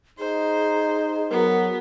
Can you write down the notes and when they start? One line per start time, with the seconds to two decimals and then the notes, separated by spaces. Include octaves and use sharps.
0.19 D#4 G#4 C5
1.31 F#3 B3 A#4